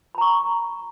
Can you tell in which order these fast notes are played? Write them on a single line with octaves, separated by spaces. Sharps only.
B5 A#5 C#6